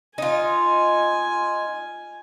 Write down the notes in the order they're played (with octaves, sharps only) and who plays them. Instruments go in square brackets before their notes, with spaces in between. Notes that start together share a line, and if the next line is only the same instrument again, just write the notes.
[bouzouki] D#4 F4 [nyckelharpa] G#5